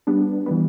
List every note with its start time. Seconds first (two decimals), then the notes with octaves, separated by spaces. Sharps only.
0.07 G3 B3 D4
0.46 E3 G3 B3